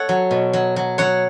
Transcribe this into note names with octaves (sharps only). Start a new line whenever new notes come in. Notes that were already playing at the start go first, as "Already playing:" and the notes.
Already playing: A4 C#5 F#5
F#3
B2
F#3
F#3
F#3 C#5 F#5